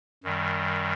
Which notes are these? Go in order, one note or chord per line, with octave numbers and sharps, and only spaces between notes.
F#2 D#3 G3